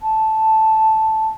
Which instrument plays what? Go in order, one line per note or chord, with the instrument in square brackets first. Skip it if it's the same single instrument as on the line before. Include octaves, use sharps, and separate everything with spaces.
[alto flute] A5